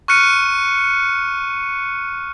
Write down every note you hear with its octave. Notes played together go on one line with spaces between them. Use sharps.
C#6 F6 F#6 C#7 D#7